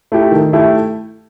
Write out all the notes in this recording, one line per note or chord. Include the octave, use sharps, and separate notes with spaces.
A3 E4 G4
D#3
A3 E4 G4